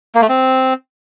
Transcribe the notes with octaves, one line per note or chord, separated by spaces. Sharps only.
A#3
A3
C4